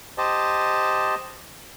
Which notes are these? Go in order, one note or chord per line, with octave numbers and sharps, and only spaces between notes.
G4 C5 D#5 A5